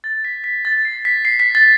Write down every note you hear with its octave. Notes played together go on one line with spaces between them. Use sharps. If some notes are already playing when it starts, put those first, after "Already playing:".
A6
B6
B6
A6
C7
B6
C7
B6
A6